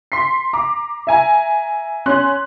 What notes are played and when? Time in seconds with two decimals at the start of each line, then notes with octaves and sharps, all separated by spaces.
0.12 C6 B6 C7
0.53 A#5 D6
1.07 E5 G#5 A#5
2.06 C#4 C6 F#6